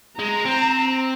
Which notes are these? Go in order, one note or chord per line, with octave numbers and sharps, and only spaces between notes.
G#3 A#5
C4